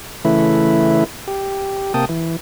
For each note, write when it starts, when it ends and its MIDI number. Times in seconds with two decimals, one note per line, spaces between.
0.25 1.04 49
0.25 1.04 52
0.25 1.04 57
0.25 1.04 64
0.25 1.04 71
1.28 1.93 67
1.94 2.05 48
1.94 2.05 58
1.94 2.05 79
1.94 2.05 81
1.94 2.05 87
2.09 2.36 52